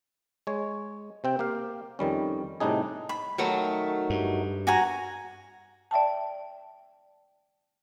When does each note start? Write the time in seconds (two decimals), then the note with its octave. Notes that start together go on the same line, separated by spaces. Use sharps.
0.47 G#3 C#5
1.24 C3 C4 G5
1.39 A#3 G4 F5
1.99 F2 D#3 G3 C#4
2.60 A2 C3 G3 D4 D#4 G#4
3.09 B5
3.38 D#3 F#3 A3
4.10 G2
4.67 F#4 G#5 A#5
5.91 D5 E5 G5 A5